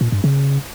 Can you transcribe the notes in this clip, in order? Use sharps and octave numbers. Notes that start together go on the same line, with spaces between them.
A#2
G2
C#3